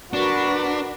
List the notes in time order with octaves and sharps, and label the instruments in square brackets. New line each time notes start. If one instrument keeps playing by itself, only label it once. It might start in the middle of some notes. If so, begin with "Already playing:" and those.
[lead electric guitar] D4 [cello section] F#4 A#4 B4